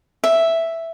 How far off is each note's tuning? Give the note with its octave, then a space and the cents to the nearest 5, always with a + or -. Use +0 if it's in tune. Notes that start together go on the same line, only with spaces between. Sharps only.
E5 +0